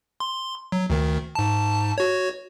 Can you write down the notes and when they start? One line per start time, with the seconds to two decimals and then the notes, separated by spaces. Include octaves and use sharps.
0.20 C6
0.72 F#3
0.90 D2 D#3
1.35 G#2 A5
1.98 F#4 C#5